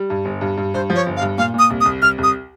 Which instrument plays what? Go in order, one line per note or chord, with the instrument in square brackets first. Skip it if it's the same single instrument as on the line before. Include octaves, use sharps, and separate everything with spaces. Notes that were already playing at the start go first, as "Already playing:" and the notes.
Already playing: [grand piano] G3
G2
G1
G2
G2
[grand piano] G2 [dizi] C5
[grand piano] F3
[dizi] C#5
[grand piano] G1
[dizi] F5
[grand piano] G2
[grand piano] A#2 [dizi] F5
[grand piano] A#2 [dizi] D#6
[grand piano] C2
[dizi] D#6
[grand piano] C2
[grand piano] C2 [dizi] F6
[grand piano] C2
[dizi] D#6